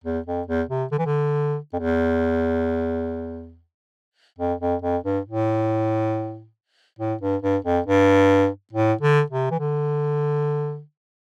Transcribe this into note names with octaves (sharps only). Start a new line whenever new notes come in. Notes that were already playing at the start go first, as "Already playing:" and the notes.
E2
F2
E2
C3
D3
E3
D3
F2
E2
F2
F2
F2
G2
A2
A2
G2
G2
F2
G2
A2
D3
C3
E3
D3